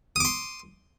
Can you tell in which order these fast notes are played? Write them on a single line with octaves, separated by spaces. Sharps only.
D#6 D6 C6